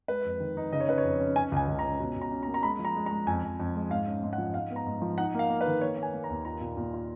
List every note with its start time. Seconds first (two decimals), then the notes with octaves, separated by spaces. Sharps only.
0.08 G#3 B4
0.25 F2
0.40 D#3
0.57 D#4
0.72 C#3 D#5
0.81 C#5
0.88 C#4 B4
0.98 C#5
1.04 F2
1.20 C#4
1.36 C#4 G#5
1.52 C#2 G#5
1.68 C#2
1.79 A#5
1.83 C#4
1.99 B2 A#5
2.16 B2
2.22 A#5
2.31 C#4
2.43 A#5
2.47 A#3
2.54 A#5
2.63 G#3 B5
2.79 F3
2.85 A#5
2.96 G#3
3.06 A#5
3.11 G#3
3.27 F2 G#5
3.43 F2
3.59 F2
3.75 G#3
3.90 G#2 F5
4.07 C#4
4.23 G#2
4.33 F#5
4.38 F3
4.54 G#2 F5
4.71 B3
4.76 A#5
4.87 G#2
5.02 F3
5.18 D#4 F#5
5.34 A#3 F5
5.50 A#3
5.61 B4
5.66 D#3
5.81 A#3 C#5
5.97 A#3
6.03 G#5
6.14 A#3
6.24 A#5
6.30 D#2
6.45 F4 A#5
6.61 A#2
6.77 A#2
6.94 F4